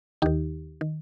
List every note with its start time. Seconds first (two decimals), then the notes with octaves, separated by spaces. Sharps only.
0.22 D#2 D#3 D#4 G4
0.81 D#3